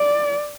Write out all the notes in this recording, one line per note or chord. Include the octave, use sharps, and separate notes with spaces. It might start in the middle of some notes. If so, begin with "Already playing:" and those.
Already playing: D5